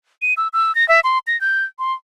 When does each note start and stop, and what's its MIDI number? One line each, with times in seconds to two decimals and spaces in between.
0.22 0.34 99
0.37 0.48 88
0.53 0.74 88
0.75 0.87 94
0.89 1.00 76
1.04 1.18 84
1.27 1.39 94
1.41 1.64 91
1.79 1.93 84